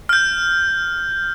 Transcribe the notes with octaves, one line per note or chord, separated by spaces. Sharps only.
F6 G6